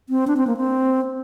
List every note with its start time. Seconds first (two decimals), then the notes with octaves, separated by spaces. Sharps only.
0.09 C4
0.27 D4
0.37 C4
0.47 A#3
0.57 C4